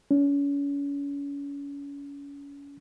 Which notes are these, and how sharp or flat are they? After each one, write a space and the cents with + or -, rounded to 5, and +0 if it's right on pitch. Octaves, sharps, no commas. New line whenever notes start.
C#4 +35